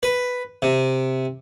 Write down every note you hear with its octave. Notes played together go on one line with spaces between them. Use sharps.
B4
C3